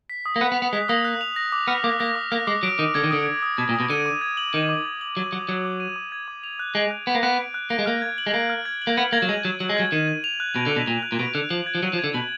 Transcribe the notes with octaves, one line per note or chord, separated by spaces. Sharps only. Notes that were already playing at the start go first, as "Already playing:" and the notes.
B6
D#6
A#3
B3 F#6
B3
F7
B3
G#3 B6
A#3 D#6
F#6
F7
A#6
D6
B3 F6
A#3 D6
A#3 A#6
D6
A#3 F6
G#3 D6
F#3 D7
D#3 D#6
D3 G#6
D#3
D3 D#6
D7
D#6
B2 G#6
A#2
D#6
B2
D3 D#7
D6
G#6
F#7
D#3 D#7
D6
G#6
F#7
F#3 D#7
F#3 D6
F#3 G#6
D6
D#7
D6
G#6
D6
F7
F#6
G#3 D7
F#6
B3 F7
A#3
B3 F#6
D7
F#6
A#3 D7
G#3
A#3 F6
G#6
F#7
G#3
A#3 D7
F6
G#6
F#7
A#3
B3 F#7
A#3 G#6
F#3
G#3 D#7
F#3 G#6
F#3 F#7
G#3
F#3 G#6
D#3 D#7
G#6
F7
F#6
B2 D7
D3
B2 F#6
A#2 F7
F#6
A#2
B2 D7
D3 F#6
F3 F#7
G#6
F3
F#3 D#7
F3
G#6
D3
B2 F#7